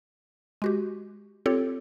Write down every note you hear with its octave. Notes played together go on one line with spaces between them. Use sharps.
G#3 F#4 G4
C4 F4 G4 A4 C#5